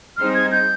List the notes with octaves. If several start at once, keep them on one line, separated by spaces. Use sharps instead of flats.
G3 C4 D#4 G#4 C5 F6
G#6
G6